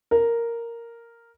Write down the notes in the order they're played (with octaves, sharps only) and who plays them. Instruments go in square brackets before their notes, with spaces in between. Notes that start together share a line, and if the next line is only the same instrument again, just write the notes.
[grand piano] A#4